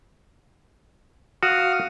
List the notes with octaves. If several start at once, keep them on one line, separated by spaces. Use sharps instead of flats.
F#4 F5 D#6